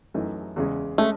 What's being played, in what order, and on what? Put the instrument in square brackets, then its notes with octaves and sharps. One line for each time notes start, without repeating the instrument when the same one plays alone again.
[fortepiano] F#2 E3 A3 D#4
E2 C#3 G#3
[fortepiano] G#3 C#4 [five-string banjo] A3